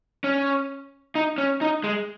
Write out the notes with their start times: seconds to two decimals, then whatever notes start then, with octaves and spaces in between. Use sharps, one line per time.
0.24 C#4
1.15 D#4
1.38 C#4
1.61 D#4
1.84 G#3